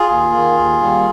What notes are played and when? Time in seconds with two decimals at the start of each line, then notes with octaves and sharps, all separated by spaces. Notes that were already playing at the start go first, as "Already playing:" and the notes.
Already playing: F4 G#4
0.09 D#2
0.32 D#3 A#3
0.57 D#2
0.81 D#3 G3 A#3